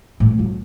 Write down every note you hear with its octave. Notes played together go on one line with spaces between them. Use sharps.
A2
F#2